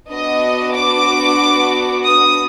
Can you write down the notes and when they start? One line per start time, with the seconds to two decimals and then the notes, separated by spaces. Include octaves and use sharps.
0.10 B3 D4 F#4 D#5
0.75 D6
2.04 D#6